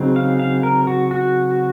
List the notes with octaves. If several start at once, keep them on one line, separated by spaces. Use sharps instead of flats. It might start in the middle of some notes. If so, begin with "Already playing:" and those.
Already playing: C#3 F#3 C4 D#4
F5
F5
A#4
F#4
F#4